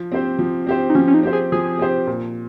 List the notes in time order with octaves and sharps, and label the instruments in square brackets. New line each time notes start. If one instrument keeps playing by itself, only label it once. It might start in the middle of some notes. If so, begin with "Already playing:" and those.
Already playing: [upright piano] F3
C4 G4 C5
F3
C4 G4 C5
[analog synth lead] D#4
[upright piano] F3 [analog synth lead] C#4
[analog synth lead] C#4
D#4
[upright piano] C4 G4 C5
[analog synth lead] G#4
[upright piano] F3 [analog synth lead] G#4
[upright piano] C4 G4 C5
A#2